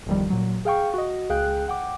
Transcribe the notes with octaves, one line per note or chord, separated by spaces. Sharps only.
G1 E2 D#3 F3 G3
A#2 F#3
G#4 F5 G5 C#6
F#4 D#5
C#2 G#4 F5 G5 F#6
F#5 G5 D6